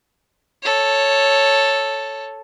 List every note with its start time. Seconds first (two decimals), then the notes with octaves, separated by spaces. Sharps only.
0.63 A4 C#5